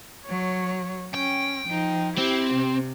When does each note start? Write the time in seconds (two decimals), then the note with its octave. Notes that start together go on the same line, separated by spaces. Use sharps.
0.26 F#3 C#5
1.14 C#4 G5
1.68 F3 D#4
2.18 C4 E4 G4
2.54 C3